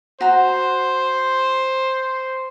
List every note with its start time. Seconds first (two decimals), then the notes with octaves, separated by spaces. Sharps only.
0.21 F#4 C5 A#5